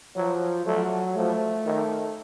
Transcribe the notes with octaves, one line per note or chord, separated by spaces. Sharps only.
F3 F#3
F#3 A3
F3 A3
D#3